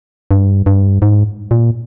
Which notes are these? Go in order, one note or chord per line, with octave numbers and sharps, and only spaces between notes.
G2
G2
G#2
A#2